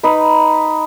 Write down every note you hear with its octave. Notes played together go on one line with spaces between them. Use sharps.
D#4 B4